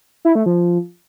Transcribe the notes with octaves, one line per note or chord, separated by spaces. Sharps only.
E4
A3
F3